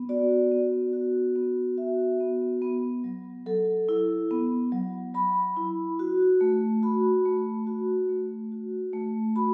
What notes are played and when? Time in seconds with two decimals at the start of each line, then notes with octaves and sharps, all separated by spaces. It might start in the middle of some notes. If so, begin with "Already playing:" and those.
Already playing: B3
0.09 F#4 D5
0.52 B3
0.93 F#4
1.36 B3
1.78 F#4 E5
2.20 B3
2.62 B3
3.04 F#3
3.46 F#3 A4
3.89 E4
4.31 B3
4.72 F#3
5.15 F#3 B5
5.57 E4
5.99 F#4
6.41 A3
6.83 F#4 B5
7.25 A3
7.67 F#4
8.09 A3
8.52 F#4
8.93 A3
9.36 F#4 B5